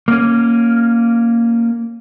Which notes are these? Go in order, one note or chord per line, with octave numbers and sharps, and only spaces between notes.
A#3 C#4